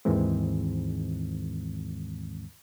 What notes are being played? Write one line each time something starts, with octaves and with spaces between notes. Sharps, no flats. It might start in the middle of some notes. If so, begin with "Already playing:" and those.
D#2 G#2 D#3 E3 G#3 C4